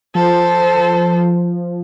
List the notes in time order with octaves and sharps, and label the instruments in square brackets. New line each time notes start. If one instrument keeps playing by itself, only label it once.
[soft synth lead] F3 [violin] A4 C5